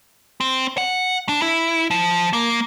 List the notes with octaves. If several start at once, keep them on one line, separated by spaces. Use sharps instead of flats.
C4
F#5
D4
E4
F3
A#3